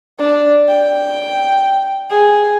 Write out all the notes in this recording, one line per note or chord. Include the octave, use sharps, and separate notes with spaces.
D4
G5
G#4